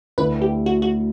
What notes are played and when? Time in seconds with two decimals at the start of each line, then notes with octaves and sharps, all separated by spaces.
0.18 D2 D3 A3 E4 B4
0.42 G4
0.66 F#4
0.82 F#4